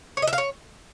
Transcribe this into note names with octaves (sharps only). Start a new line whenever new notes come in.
C#5
D#5
E5
F5
C#5